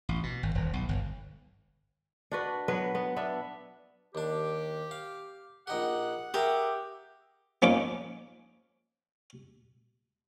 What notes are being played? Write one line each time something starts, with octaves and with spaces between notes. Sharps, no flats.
A1
B2
G#1
D#1
B1
G1
D4 F#4 B4
F#3 B3 B4
B3
B3 D4 E5
D#2 D4 G4
F5
A#1 D#4 G4 F#5
G4 G#4 A#4 E5
F3 A#3 C#4 D#4 D6